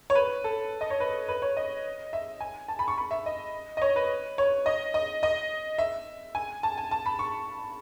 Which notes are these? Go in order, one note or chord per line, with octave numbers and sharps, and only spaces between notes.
C#5
B4
A4
D#5
C#5
B4
B4
C#5
D#5
E5
G#5
A5
B5
C#6
B5
E5
D#5
D#5
C#5
B4
C#5
D#5
D#5
D#5
E5
G#5
A5
G#5
A5
B5
C#6